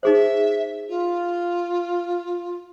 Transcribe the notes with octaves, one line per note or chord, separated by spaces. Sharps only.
D#4 G#4 C5 E5
F4